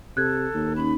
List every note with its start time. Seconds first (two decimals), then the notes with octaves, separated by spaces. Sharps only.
0.17 C3 A4 F#6 G#6
0.54 D#2
0.76 C#4 D#4 B5